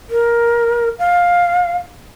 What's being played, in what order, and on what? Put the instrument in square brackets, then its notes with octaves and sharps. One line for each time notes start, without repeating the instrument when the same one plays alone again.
[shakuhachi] A#4
F5